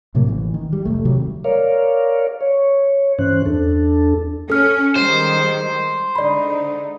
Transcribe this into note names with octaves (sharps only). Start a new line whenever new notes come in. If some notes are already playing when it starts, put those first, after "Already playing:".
A2 C3 F#3 A#3
A1 E3
D#3
G3
F1 C#2 A3
C3 D#3 F#3 G3
A#4 C#5 D5 F5
C#5
G2 E3 C#4 C5 F#6
E2 D4 A4
C#4 A4 F6
D#3 G3 G#3 C5
D3 G#3 D#4 D5 B5